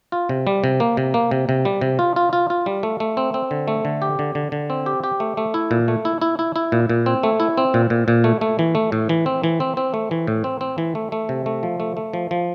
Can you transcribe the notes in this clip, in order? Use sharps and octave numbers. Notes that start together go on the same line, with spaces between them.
F4
C3
G3
C3
A#3
C3
A#3
C3
C3
G3
C3
F4
F4
F4
F4
G3
A3
A3
C4
C4
D3
A3
D3
G4
D3
D3
D3
C4
G4
G4
A3
A3
E4
A#2
A3
E4
E4
E4
E4
A#2
A#2
C4
A3
E4
C4
A#2
A#2
A#2
A3
A3
E3
A3
A2
E3
C4
E3
C4
C4
A3
E3
A2
C4
C4
E3
A3
A3
C3
A3
F3
A3
A3
F3
F3